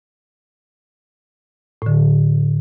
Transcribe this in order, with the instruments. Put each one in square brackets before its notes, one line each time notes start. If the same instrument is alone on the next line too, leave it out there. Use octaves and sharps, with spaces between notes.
[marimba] A2 D3